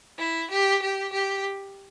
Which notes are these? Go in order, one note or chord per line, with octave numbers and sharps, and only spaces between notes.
E4
G4
G4
G4